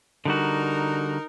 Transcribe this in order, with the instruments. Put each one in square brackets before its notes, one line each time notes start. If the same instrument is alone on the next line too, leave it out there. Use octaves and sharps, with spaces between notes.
[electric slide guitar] D3 G3 F#4 [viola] D#4 A#4